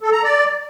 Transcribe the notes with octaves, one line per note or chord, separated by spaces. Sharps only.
A4
A#5
D5